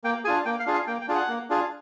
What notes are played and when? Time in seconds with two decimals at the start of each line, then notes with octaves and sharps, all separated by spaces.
0.04 A#3 G5
0.24 D4 F4 G#4 G#5
0.45 A#3 G5
0.60 F5
0.66 D4 F4 G#4
0.74 F5
0.87 A#3 G5
1.01 G5
1.08 D4 F4 G#4
1.15 F#5
1.28 A#3
1.50 D4 F4 G#4